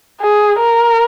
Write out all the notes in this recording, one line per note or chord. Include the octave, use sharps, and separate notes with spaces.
G#4
A#4